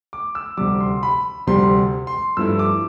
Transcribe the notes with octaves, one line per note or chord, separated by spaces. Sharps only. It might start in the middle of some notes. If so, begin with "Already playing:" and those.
D6
E6
D2 C3 G3 D6
C6
B5
D2 C3 G3 C6
C6
G2 F3 A3 E4 E6
D6